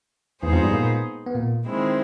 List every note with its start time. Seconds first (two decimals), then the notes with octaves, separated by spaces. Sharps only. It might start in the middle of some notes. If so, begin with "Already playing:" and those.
0.43 E2 E3 G#3 B3 D#4 G#4 C5
0.53 F2 F3
0.63 G2 G3
0.73 A#2 A#3
1.26 B3
1.35 A#2 A#3
1.66 D#3 G#3 C4 E4